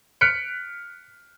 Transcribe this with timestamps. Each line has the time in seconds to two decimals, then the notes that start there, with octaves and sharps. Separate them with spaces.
0.21 F6 F#6 B6 C#7 D7